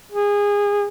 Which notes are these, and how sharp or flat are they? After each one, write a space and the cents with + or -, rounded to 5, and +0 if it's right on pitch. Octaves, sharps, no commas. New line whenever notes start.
G#4 -25